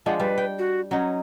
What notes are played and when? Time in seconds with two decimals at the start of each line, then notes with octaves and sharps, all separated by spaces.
0.06 F3 G#3 D4 F#5
0.20 G3 B4
0.38 G5
0.59 F#4
0.91 F#3 C#4 D#4